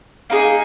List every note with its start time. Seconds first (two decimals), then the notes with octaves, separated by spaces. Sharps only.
0.30 A#3 D#4 G#4